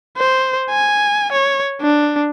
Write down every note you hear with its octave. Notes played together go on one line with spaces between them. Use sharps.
C5
G#5
C#5
D4